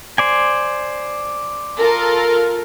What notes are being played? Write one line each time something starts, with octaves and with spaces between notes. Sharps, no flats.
C5 D5 G#5
F4 A4 A#4